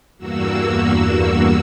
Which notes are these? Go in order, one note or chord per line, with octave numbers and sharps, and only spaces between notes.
E2 G2 A#3 F#4 E6